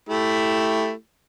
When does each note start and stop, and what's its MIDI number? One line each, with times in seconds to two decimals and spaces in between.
0.09 0.92 57
0.09 0.92 64
0.09 0.92 67